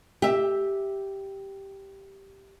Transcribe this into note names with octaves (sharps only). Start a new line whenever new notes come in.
G4 E5